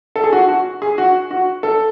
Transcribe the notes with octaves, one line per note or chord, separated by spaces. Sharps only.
A4
G#4
F#4
F#4
G#4
F#4
F#4
A4